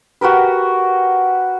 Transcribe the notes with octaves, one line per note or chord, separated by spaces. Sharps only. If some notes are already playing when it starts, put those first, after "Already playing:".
F#4 G4 A#4 B4